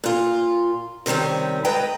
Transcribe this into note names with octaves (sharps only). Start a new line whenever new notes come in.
A#2 F4
C3 D#3 G3 C4 C#4
G#2 B4 D#5 G5 A#5